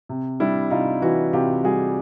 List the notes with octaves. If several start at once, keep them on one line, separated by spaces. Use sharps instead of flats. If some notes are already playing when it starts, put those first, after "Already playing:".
C3
G3 D4 E4
C3 D#4 F4
E3 E4 F#4
C3 F4 G4
G3 F#4 G#4